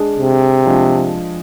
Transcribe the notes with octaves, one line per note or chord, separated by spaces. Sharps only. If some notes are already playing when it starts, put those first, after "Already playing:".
Already playing: G#3 D4 G#4
C3
F3 G#3 D4 G#4